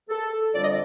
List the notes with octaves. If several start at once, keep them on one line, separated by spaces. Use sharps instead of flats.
A4
F2 D3 G3 D5
D#5